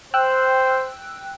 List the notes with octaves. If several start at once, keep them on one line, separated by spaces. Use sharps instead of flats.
C5 G5 E6 F#6